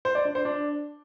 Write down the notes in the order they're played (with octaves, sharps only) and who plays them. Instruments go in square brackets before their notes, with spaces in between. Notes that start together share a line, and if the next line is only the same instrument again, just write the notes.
[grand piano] C5
D5
D4
C5
D4